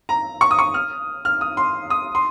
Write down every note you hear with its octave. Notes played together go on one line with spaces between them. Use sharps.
A#5
C#6
D#6
C#6
F6
F6
D#6
C6
D#6
C6